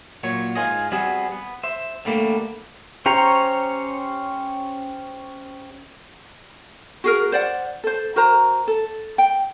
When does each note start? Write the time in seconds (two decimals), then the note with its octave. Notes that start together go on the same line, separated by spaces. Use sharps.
0.23 A#2 F#3 C#5
0.55 G#2 F4 G#4 D#5
0.92 G3 B3 C4 F#4 G#4
1.32 B3
1.63 C5 E5
2.05 D3 G3 A3 A#3
3.06 C#4 G4 C5 C#5 A#5
7.04 F#4 G#4 A#4
7.32 C5 D5 F#5
7.84 A4 C5
8.16 F#4 A#4 C5 A#5
8.68 A4
9.18 G5